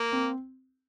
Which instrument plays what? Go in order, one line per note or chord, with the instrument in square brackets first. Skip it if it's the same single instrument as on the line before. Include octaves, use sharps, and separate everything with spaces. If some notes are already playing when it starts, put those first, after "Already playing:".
Already playing: [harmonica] A#3
[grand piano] C4